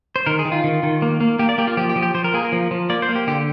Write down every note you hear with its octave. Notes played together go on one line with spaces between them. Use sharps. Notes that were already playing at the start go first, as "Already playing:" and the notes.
C5
D#3 A#4
G#4
D#3
F4
D#3
D#3
A#3
A#3
A#3 G4
D5
A#3 G4
F4
F3 G4
G4
F3
G4
F3 C5
A#4
A#3 G#4
A#4
F3
F3
A#3 D5
C5
A#3
G4
D3 G4